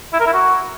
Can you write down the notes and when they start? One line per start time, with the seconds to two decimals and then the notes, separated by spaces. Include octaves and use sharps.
0.13 E4
0.19 A#4
0.26 E4
0.33 F#4